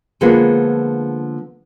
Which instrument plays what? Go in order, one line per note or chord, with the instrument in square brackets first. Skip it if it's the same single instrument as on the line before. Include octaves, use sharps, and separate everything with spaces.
[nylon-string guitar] D3 F3 G#3 A#3 B3 G#4